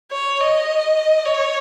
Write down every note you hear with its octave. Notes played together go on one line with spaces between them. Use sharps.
C#5
D#5
C#5